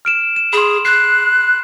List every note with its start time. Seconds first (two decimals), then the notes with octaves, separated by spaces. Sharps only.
0.05 F6 D7 E7
0.36 E7
0.53 G#4 B5 C6
0.85 F#6 C7